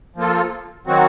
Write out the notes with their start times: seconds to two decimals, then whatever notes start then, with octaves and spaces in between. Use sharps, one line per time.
0.16 F3 A#3 F4 A4
0.87 D#3 F#3 C4 F#4